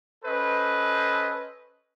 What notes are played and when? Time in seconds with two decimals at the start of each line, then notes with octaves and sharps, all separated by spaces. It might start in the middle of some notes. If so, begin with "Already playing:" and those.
0.24 C#4 A4 B4 C5 D#5